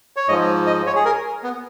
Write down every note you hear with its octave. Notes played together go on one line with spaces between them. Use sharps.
C#5
G#2 F3 D#5
D#5
C#5
G#4
A#4
B3